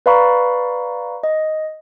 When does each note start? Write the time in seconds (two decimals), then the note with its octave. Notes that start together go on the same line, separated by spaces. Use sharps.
0.06 B4 D5 F5 A#5 B5 C#6
1.23 D#5